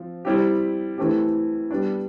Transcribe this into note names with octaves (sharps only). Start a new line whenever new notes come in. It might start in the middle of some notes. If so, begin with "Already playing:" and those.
Already playing: F3 C4
G3 C4 E4 G4
E3 A3 C4 G4
G3 B3 D4